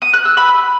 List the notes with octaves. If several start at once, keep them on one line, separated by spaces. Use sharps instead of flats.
D#6
F#6
E6
B5